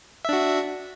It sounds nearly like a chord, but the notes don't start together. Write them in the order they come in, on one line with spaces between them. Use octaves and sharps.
E5 D4 F#4